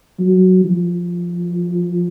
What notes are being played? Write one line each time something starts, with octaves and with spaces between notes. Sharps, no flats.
F#3
F3